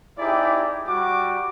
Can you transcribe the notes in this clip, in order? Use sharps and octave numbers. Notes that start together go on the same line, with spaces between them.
C4 D#4 E4 G4 G#4 D5
G3 F#4 D6